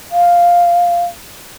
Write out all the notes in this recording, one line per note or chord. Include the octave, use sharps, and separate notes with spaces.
F5